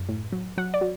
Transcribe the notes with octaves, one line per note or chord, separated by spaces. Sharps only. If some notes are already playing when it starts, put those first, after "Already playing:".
Already playing: F#2
A2
F#3
F#3 F#5
D5
F#3